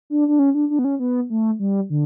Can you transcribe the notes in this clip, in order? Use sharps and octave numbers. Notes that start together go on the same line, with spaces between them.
D4
D4
C#4
D4
D4
B3
C#4
B3
A3
G3
D3